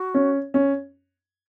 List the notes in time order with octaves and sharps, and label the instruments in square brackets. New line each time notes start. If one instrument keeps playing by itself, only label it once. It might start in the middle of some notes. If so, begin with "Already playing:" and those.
Already playing: [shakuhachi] F#4
[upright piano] C#4
C#4